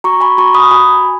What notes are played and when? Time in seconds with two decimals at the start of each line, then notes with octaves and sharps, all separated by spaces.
0.04 F#4 A#5 C#6
0.21 G#5 B5
0.38 F#4 A#5 C#6
0.54 B5 D#6
0.71 F#4 G#5 B5